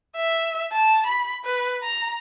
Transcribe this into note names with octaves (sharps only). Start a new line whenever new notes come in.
E5
A5
B5
B4
A#5